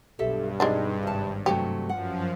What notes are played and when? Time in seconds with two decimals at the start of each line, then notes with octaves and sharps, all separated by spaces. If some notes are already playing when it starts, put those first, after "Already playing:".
0.19 B1 G2 G4 A4 E5
0.60 B1 G#3 C4 D4 D#4
1.03 G#1 C3 A5
1.46 G2 C3 F#3 A3 G4
1.89 F#2 F3 F#5